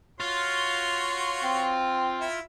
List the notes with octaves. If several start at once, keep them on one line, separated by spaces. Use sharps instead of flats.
F4 F#4 C#5 C6
C4
E4 E5